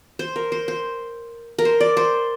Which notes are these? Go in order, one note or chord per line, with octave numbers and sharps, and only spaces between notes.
C5
A#4
C5
C5
A#4
C5
D5
C5